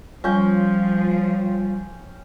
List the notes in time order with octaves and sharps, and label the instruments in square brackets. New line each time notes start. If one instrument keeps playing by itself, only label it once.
[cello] F3 [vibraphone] G3 [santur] C#4 G5 [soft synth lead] F4